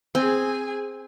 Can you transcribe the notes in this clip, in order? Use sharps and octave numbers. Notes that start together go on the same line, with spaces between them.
C4 G#4 G#5